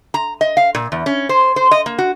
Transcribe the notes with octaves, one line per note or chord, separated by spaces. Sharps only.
A#5
D#5
F5
A#2
E2
C#4
C5
C5
D#5
A#3
F#4